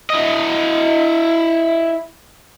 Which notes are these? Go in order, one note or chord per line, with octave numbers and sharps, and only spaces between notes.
E4 D#5